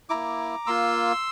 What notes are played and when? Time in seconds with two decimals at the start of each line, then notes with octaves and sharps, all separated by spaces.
0.09 A#3 E4 A#5 D6
0.66 A#3 F4 C6 E6